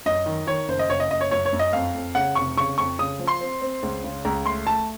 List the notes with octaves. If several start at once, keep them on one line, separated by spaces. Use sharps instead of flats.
F#2 D#5
D#3
D#3 C#5
F#1 C5
D#5
F#1 C#5
D#5
F#1 D#5
C#5
F#2 C#5
C#5
F#2
D#5
F2 F5
F2
C#3 F#5
F1 C#6
C#3 C#6
F2 C#6
C#3 D#6
F3
C6
C4
C4
C#2
C#3
C#2 A#5
A3 C6
A3 A5